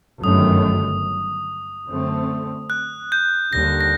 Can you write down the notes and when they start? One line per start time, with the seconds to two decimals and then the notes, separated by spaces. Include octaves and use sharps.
0.22 G1 F#2 D#3 F#3 A3 D#6
1.88 F#2 D3 A3 C4
2.70 F#6
3.12 G6
3.52 D#2 D3 G3 A#6
3.81 A#6